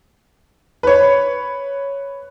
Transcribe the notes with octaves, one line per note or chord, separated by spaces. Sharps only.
B4 C#5